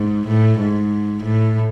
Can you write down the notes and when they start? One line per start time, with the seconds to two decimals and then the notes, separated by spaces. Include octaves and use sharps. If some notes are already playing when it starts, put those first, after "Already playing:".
Already playing: G#2
0.27 A2
0.60 G#2
1.24 A2